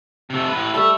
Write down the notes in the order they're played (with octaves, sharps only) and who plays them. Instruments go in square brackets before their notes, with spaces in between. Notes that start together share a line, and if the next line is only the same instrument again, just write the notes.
[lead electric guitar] C3 A3
A2 B4
[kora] G3 A3 [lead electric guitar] A4 E5